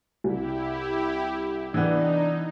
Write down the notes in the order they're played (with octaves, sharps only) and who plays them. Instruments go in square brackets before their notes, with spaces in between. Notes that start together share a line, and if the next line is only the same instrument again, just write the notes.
[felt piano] C2 [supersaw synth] E4 G4
[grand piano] E3 B3 [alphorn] D4 [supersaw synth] D#4